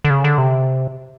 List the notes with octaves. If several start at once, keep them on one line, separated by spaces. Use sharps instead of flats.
D3
C#3
D3
C3